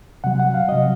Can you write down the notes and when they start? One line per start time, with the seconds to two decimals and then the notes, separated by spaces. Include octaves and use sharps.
0.24 C3 F#3 F#5
0.39 F#5
0.54 F5
0.69 C3 F#3 D#5